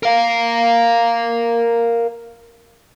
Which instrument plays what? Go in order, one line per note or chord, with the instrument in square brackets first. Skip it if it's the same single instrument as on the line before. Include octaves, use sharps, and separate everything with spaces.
[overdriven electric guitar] A#4 F5